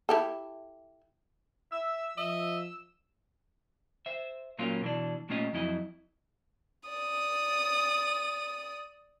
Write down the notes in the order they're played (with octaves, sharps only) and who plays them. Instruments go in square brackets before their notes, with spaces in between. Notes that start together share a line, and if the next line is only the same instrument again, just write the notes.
[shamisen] E4 G4 A4
[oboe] E5 [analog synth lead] E6
[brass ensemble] F3 [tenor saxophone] D#5 [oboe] E5
[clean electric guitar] C5 E5
A#2 F#3 A#3 C#4 F4
B2 E3 D4
A#2 A3 C#4 F4 G4 D#5
F2 F#3 E4 D#5
[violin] D5 D#6